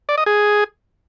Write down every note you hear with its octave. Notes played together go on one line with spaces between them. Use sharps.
D5
D#5
G#4